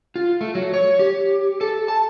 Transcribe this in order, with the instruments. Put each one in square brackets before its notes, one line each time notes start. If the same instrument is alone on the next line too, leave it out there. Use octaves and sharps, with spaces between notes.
[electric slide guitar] F4
A3
F#3
C#5
G4
A4
A5